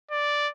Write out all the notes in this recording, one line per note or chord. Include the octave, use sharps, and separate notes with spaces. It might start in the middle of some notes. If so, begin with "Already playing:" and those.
D5